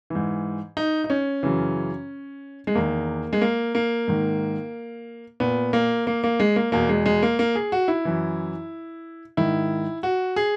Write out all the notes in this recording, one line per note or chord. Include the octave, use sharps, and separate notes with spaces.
G#2 E3
D#4
D#4
C#4
F#2 C#3 E3
G#3
E2 D#3 A#3
G#3
A#3
A#3
G#2 D#3
A#2 B3
A#3
A#3
A#3
G#3
A#3
E2 B2 A#3
G#3
G#3
A#3
A#3
G#4
F#4
E4
F#2 E3
G#2 D#3 E4
F#4
G#4